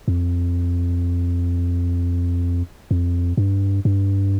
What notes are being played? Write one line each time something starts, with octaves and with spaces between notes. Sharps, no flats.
F2
F2
G2
G2